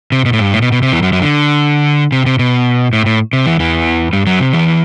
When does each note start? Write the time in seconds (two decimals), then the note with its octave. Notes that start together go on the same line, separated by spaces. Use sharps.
0.12 C3
0.26 B2
0.33 A2
0.39 G2
0.52 A2
0.62 B2
0.72 B2
0.83 C3
0.92 E2 E3
1.02 F#2 F#3
1.13 F#2 F#3
1.22 D3
2.12 C3
2.26 C3
2.39 B2
2.93 A2
3.06 A2
3.33 C3
3.46 E2 E3
3.60 E2 E3
4.13 G2 G3
4.26 F#2 F#3
4.40 C3
4.53 E2 E3